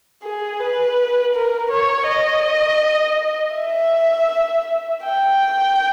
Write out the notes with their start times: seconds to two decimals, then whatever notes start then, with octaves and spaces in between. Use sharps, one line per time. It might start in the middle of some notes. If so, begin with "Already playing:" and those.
0.23 G#4
0.60 B4
1.34 A#4
1.71 C#5
2.08 D#5
3.56 E5
5.04 G5